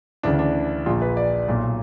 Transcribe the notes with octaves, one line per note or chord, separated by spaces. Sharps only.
D2 C#3 E3 D4
D4
A#1 A#2 F4
B4
D5
B1 A#2